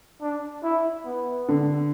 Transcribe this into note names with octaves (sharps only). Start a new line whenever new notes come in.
D4
E4
B3
D3